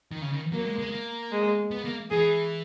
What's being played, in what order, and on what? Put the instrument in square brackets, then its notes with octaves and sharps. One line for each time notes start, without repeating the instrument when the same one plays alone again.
[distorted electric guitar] D#3
C#3
D#3
[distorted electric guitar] F#3 [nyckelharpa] A#3
[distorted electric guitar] G#3
G#3
A#3
[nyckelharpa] G#3
[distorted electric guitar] B3
A#3
[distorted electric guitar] E3 [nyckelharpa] G#4